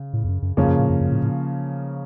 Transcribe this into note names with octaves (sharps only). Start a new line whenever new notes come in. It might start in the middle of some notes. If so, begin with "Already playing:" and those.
Already playing: C#3
A2
F2
F#2
F#2
F2 C#3 F3 A#3 C#4
F#2
A2
F#2
F#2
A2
A2